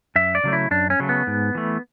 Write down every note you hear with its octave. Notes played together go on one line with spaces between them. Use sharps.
F#2 E5
D5
C#3 F#3 A3
E4
F#2 D4
C#4
C#3 F#3 A3
B3
G#2
E3 A3